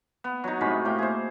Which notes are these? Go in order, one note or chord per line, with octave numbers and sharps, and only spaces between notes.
B3
F#3 D#4
A2 C3 G#3 B5
A2 A#3 G5
G#4 C5